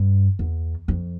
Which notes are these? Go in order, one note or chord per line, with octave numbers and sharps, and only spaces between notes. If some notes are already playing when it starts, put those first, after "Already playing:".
Already playing: G2
E2
F2